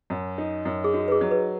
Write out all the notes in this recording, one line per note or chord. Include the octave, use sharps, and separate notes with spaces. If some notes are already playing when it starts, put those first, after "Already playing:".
F#2
D#4
F#2
G#4
D#4 F#4
B4
G#4
F#3
B4